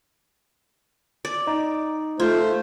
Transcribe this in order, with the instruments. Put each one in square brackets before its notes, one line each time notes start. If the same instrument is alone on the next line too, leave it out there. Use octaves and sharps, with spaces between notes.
[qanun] D5
[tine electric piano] D#4
[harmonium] A3 C5 [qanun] F4